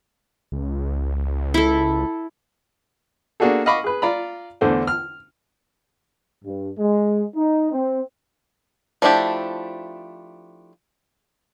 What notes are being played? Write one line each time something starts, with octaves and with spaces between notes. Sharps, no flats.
C#2
E4 A4
A#3 D4 F#4 G#4 A4
D#5 F5 F#5 B5 C#6 D6
G#4 B4
F4 D5 A#5 B5
E2 D3 A3 C5
F6
G2
G#3
D#4
C4
F3 A3 D4 E4 G4